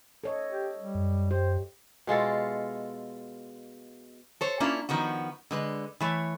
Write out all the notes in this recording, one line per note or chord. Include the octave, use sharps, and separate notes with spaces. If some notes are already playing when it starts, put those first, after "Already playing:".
A4 C#5 D#5
G4
G3
F#2
G4 C5
B2 G#3 F4 A4
A4 C5 C#5
A#3 C#4 D4 E4 F4
D#3 F3 B3 F#4
D3 G#3 B4
E3 A3 C#5